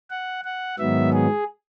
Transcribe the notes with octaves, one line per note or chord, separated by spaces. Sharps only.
F#5
F#5
G#2 D#3 F#3 B3 E5
G#4